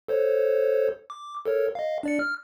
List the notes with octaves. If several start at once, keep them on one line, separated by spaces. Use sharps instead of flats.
A4 C5 C#5
D6
A4 A#4 C#5
D#5 F5
D4 D5 C#7
F6